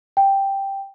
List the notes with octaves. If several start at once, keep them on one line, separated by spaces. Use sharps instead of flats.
G5